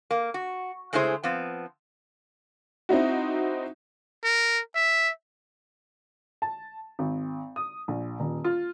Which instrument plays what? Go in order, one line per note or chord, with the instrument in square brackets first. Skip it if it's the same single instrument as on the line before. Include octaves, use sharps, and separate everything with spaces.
[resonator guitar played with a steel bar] A#3
F#4
C#3 G#3 A3 E4 G#4 C5
F3 B3 C4
[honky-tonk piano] C4 D#4 E4 F#4
[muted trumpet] A#4
E5
[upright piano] A5
G#1
D#6
A#1
D#1
F4